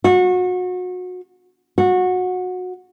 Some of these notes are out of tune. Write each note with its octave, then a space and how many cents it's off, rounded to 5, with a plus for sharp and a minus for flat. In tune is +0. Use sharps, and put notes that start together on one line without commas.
F#4 -30
F#4 -20